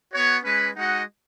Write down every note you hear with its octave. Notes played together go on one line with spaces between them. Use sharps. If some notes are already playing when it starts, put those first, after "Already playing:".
B3 F#4 C#5
G#3 C#4 B4
G#3 D#4 F#4 D#5 F#5